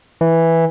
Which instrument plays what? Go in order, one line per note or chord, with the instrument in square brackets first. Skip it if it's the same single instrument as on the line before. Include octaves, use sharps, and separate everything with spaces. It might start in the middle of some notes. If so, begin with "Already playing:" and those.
[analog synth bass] E3